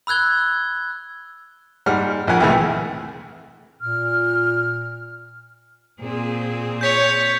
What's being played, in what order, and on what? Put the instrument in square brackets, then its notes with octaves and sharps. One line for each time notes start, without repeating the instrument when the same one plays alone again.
[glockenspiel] B5 E6 F#6 G#6 G7
[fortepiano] G#2 G3 F#5 F6
A#1 F2 A#4 F#5 G#5
C2 F2 A2 E3 G#3 A3
[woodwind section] A#2 F6
[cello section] A#2 C4 G#4
[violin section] C#5 [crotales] G6 B6 F7